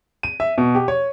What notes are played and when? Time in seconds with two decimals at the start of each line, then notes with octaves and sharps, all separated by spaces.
0.23 D#7
0.40 E5
0.58 B2
0.75 G4
0.88 C#5